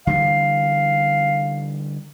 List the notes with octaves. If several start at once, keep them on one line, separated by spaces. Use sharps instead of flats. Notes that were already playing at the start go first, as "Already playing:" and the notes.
D3 E3 G3 F5